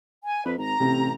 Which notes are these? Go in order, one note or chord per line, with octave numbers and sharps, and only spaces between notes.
G#5
F2 B4
G#1 A#5
A1 C3